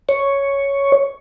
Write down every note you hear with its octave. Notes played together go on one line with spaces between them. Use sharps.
C#5